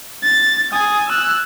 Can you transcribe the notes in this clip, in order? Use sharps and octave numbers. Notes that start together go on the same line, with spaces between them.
A6
G#5 D#6
E6 F#6